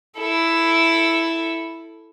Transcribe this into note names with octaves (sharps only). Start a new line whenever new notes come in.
E4 A4